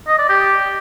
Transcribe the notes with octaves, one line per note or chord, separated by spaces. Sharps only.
D#5
D5
G4